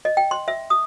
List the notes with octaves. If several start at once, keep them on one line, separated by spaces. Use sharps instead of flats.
D#5
G5
C6
E5
D#6